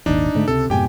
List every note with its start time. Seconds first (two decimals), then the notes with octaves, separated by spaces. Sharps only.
0.06 D#1 G#1 D#2 D4 D#4
0.35 G#2 D3 A3
0.48 C#2 C3 A4
0.70 F2 G#2 B2 G4 G5 G#5